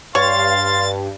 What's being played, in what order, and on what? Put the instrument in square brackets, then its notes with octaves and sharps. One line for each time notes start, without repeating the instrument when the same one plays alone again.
[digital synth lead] G2 [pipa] C#5 [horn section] F5 C6 [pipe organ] A6